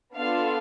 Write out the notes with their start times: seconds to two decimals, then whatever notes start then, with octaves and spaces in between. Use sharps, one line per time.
0.16 B3 D4 F4 A4 F5